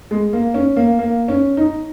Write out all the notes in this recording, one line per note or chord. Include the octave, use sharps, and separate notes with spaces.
G#3
A#3
C#4
A#3
A#3
C#4
D#4